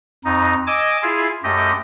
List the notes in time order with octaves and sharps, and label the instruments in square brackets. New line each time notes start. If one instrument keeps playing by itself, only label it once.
[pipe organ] F2 D#4
D#5 G#5 D6 E6
E4 F4 G#4
F#2 A3 G4 D#5